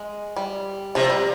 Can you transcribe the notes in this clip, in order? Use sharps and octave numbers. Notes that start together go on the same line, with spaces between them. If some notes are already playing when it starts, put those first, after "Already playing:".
Already playing: G#3
G3
C3 F3
G3